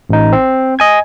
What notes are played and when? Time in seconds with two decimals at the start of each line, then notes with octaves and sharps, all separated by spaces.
0.09 A1 D#4
0.33 C4
0.79 D#5 G#5 G#6